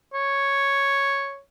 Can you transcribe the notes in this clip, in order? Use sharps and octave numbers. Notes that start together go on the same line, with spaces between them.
C#5